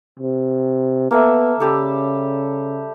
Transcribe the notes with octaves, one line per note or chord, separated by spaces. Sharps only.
C3
A#3 B3 A4 E5
C#3 G3 G4 A4